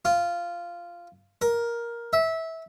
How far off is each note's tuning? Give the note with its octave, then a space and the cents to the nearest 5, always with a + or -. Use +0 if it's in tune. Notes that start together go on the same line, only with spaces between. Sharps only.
F4 -10
A#4 +10
E5 -20